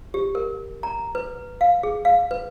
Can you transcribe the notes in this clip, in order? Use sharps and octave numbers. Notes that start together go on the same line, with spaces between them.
G4
A#4
A#5
B4
F5
G#4
F5
B4